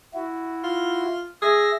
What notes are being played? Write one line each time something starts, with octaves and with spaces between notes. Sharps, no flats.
E4 F#4
F4
G#4 E5 A#6